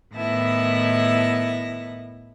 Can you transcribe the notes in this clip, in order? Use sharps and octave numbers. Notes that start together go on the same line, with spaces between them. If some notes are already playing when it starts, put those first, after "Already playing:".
A2 D#3 B3 E4 A5 A#6